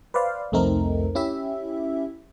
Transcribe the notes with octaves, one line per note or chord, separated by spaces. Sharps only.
B4 C5 D5 F5
C2 F2 A3 C4 D#4 A#4
C#4 E4 G4 E5